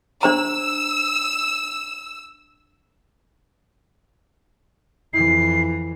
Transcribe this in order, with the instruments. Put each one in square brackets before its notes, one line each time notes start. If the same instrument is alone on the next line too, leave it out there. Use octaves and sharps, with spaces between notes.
[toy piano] D4 C5 A#5 [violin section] E6
[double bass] F2 E3 [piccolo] C7